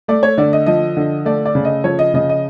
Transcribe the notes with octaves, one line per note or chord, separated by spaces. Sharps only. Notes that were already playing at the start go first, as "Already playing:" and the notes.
A3 D5
C#5
D3 D5
D#5
F3 D#5
D3
A3 D5
D5
C#3
D#5
F3 C#5
D#5
C#3 D#5
D#5